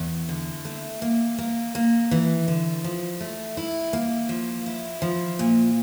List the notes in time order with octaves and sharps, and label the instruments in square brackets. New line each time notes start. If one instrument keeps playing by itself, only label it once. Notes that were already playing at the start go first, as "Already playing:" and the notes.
Already playing: [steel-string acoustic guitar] E2
D3
A3
A#3
A#3
A#3
E3
D3
F3
A3
E4
A#3
F3
E4
F3
A#2